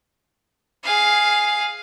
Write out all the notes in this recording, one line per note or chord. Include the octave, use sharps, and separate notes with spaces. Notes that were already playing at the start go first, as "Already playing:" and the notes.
G#4 F5